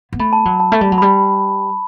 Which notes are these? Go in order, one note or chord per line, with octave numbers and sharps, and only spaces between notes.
B3
A3 B5
A5
F#3
A5
A3
G3
F#3
G3 B5